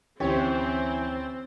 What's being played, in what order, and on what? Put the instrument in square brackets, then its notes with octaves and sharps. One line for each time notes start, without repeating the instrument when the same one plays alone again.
[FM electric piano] D2 E4 A6 [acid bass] E3 [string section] C4 [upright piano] C#4 G4 C#5